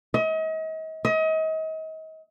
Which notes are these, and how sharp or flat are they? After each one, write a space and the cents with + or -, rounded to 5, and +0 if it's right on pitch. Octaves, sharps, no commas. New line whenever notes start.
D#5 +40
D#5 +35